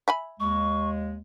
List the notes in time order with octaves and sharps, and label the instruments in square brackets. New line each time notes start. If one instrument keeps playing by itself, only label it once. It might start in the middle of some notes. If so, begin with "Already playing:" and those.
[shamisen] E5 G#5 B5
[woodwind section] D#2 G#3 [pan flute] C#6